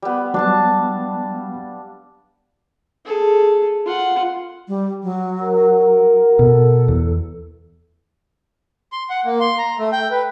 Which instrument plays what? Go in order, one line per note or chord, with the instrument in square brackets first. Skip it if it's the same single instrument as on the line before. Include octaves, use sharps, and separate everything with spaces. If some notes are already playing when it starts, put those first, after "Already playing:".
[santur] G3 B3
[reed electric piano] F#3 G3 B3 [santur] D4 F5 A5
[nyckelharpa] G#4 A4
F4 F#5
[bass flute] G3
F#3
[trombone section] F#4 A#4
[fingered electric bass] B2 [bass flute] A4
[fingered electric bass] E2
[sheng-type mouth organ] C6
F#5
A#3
C6
A#5
A3
G5
B4